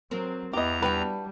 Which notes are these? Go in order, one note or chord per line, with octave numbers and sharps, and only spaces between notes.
F#3 C4 A#4
E2 B3 E4 G4 D#5 A#5
G3 D4 F#4 B4 G5